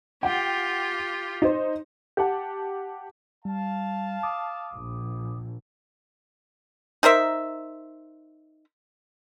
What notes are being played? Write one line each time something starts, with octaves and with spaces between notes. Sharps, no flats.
F4 G4 F#5 G5
D#4 C5
G4 F#5 A5
G3 F5 A5
D6 D#6
A#1
D#4 A#4 C5 E5